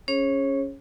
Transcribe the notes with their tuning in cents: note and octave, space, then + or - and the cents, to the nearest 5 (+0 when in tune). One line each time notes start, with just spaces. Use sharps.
C#4 +0 G#4 +0 C#5 -35